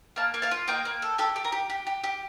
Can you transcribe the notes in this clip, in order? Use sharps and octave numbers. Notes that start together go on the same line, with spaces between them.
A#3 F5 A5
A#3
F5 A5
F4
A#3 D#5 G5
A#3
A4
G4 A4
G4
A#4
G4
G4
G4
G4